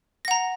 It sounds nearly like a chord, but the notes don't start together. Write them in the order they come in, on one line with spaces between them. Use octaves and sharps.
A#6 F#5 A#5